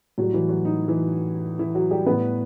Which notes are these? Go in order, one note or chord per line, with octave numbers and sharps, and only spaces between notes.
A2 F#3 G3 F#4
E3 E4
F#3 F#4
D#4
E3 E4
E3 E4
F#3 F#4
G3 G4
A2 G3 B3 B4